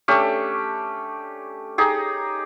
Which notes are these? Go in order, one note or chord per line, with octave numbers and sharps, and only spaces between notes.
A3 C#4 D4 G4
D#4 G4 G#4